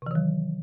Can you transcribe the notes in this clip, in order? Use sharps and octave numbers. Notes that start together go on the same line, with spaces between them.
C3 D#3 E3 F#3